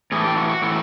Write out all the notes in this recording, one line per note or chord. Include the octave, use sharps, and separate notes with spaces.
A2 E3 A3 G#4
G4
F#4
F#4
A2 E3 A3